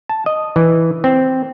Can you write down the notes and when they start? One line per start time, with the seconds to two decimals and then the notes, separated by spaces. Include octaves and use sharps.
0.09 A5
0.26 D#5
0.56 E3
1.04 C4